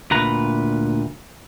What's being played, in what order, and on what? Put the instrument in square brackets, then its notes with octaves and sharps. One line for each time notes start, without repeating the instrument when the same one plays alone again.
[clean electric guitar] D2 A#2 B4 A#5